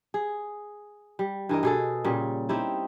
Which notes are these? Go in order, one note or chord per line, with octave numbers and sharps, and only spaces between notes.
G#4
G3
G2 E3 A#4 D#5
B2 G#4 A4
A#2 C#3 G3
C4 D#4 E4 G4